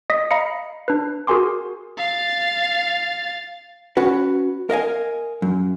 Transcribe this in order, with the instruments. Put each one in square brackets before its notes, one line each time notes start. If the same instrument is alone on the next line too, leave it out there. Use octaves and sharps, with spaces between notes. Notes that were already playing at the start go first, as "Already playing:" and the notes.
[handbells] D#5 D#6 A#6 B6
D#5 F5 A#5 B5 C#7
D4 B4
F#4 G#4 A#4 G#5 C6 D6
[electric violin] F5 A6
[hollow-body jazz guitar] C#4 F#4 B4
A#4 D#5 F5 G#5
F#2